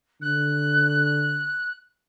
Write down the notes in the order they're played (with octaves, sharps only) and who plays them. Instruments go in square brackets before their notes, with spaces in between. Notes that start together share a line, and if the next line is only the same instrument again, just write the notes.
[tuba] D3 [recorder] F#6